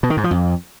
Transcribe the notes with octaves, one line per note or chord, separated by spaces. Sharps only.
B2
D#3
G#2
F3
F2